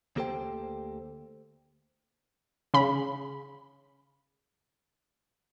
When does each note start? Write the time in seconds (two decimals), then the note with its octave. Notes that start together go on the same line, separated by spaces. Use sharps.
0.16 D2 A#3 G4 A4 C5 G5
2.74 C#3 B5